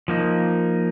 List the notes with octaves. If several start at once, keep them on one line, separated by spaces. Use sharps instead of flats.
F3 A#3 D#4